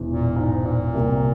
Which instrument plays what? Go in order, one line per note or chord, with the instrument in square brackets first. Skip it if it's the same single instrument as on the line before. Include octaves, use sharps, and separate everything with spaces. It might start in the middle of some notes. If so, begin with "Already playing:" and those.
Already playing: [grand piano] E1 E2 E3
[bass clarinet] A#2
G#2
A#2
[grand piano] C2 C3 G3 A#3